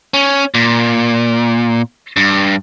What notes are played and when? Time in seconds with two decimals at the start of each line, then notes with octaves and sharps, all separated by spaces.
0.14 C#4
0.54 A#2
2.17 G2